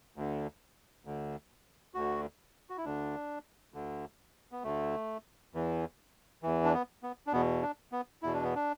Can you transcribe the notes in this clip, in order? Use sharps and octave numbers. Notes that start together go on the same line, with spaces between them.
D2 D3
D2 D3
D2 D3 F#4
F#4
E4
D2 D3 D4
D2 D3
B3
D2 D3 A3
E2 E3
E2 E3
D4
B3
B3
D4
E2 B2 B3
D4
B3
E2 B2 E4
D4
B3
D4